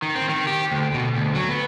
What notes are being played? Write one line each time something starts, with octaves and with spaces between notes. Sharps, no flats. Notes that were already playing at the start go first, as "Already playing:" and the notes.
D#3
C4
D#3
G4
D2
B2
D2
F#3
B3